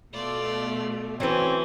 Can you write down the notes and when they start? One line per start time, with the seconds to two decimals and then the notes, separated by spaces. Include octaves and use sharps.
0.13 B2 A3 F4 D5
1.20 E3 F#3 C4 C#4